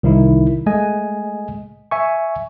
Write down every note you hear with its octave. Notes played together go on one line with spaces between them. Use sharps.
C2 D#3 D#4 E4
G#3 A3 D#5 G#5
E5 G#5 C#6